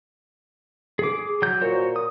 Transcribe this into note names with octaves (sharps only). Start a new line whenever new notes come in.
G#4 D6
F#3 G6
A#2 F#4 C5 C#5
D#6